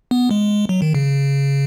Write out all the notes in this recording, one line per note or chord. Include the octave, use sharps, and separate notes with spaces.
B3
G#3
F#3
D#3
C#3